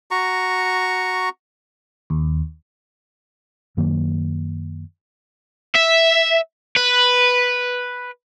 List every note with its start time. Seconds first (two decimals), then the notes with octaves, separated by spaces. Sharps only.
0.11 F#4 A#5 C#6
2.10 D#2
3.77 F#2 D#3 F#3 A#3
5.75 E5
6.76 B4